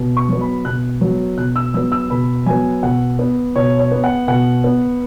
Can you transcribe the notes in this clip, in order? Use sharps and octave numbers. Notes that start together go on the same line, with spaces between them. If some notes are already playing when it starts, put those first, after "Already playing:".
Already playing: B2
C#6
F#3 B3
B5
B2 F#6
F#3 B3
B2 F#6
E6
F#3 B3 E6
E6
B2 B5
F#3 B3 G#5
B2 F#5
B3
B2 C#5
C#5
B3
F#5
B2 F#5
B3